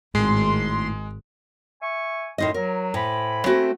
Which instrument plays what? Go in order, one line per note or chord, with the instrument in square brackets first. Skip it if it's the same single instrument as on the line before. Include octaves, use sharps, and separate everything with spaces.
[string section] G#1 [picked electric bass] A2 [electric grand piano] G#3 [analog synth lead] C6
[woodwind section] E5 G#5 C#6
[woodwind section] F#2 D#3 C6 [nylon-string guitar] A2 D#4 D#5
[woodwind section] F#3 [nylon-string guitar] A#4
[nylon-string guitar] A2 [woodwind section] C5 G#5 B5
[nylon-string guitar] A3 C4 F#4